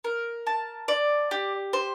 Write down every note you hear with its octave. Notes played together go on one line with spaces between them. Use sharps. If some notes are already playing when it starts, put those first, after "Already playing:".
A#4
A5
D5
G4
C5